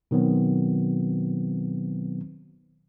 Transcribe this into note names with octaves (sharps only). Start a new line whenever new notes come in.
B2 D#3 F#3 B3 C4